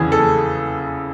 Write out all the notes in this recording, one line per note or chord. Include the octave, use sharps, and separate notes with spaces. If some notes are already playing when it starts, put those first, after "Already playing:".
Already playing: E2 C#3 E3 G#4
A4